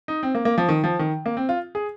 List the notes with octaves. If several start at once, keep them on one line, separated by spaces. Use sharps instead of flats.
D#4
C4
A#3
A#3
F3
D#3
F3
D#3
A#3
C4
F4
G#4